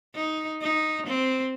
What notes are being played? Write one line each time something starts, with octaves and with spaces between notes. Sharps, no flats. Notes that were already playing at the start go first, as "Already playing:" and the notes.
D#4
D#4
C4